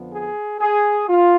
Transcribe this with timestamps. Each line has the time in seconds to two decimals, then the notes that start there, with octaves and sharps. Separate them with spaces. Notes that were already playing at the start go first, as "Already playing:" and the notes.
Already playing: F2 D3 F3 B3
0.12 G#4
0.59 G#4
1.08 F4